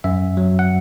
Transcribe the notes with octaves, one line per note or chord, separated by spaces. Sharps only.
F#2 E5
F#3
F#5